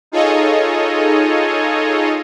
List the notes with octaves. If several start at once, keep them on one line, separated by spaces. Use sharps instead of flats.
D#4 F4 G#4 A4 C#5 D#5